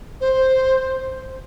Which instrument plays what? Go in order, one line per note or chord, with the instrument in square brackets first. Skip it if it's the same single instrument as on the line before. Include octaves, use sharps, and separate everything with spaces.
[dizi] C5